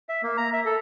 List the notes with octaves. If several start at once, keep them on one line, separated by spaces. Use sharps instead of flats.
E5
A#3
A#5
E5
A4